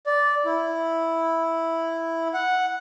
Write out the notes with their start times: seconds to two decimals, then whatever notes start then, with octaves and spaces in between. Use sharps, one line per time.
0.07 D5
0.45 E4
2.34 F#5